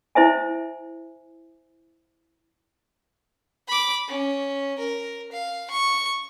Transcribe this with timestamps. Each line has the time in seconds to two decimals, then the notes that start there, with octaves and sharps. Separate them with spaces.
0.15 E4 C5 E5 G#5
3.68 B5 D6
4.08 C#4
4.79 A#4
5.32 F5
5.71 C#6